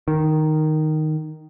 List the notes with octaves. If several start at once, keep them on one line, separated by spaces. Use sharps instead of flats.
D#3